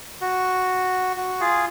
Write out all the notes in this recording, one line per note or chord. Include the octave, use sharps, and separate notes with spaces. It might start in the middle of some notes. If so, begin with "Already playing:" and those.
F#4
F#4
F4 G#4